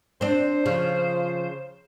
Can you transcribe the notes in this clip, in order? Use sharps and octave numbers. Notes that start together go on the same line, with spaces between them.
C4 D4 C5
C#3 F3